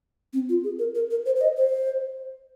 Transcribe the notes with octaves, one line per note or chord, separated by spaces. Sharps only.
C4
F4
G#4
A#4
A#4
A#4
C5
C5
D#5
C5